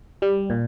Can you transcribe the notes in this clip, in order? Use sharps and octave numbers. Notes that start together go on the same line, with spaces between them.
G3
A#2